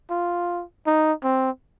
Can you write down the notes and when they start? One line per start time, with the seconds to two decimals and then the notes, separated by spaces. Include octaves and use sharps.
0.10 F4
0.86 D#4
1.23 C4